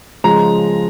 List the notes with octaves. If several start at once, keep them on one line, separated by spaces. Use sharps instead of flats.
C#3 F3 G#3 A#5